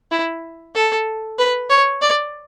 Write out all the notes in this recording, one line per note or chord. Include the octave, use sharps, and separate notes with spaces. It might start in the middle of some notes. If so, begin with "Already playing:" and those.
E4
A4
B4
C#5
D5